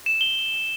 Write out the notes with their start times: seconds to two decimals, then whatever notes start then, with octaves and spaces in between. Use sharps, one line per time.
0.06 E7
0.21 G7